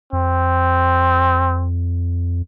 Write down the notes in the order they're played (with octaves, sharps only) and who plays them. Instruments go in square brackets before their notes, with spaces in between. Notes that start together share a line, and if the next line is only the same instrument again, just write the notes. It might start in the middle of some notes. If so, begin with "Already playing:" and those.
[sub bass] F2 [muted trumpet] C4